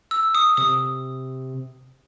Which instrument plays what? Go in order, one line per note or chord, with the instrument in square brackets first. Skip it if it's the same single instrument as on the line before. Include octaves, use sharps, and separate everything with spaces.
[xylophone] E6
D#6
[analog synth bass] C3 [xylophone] D#6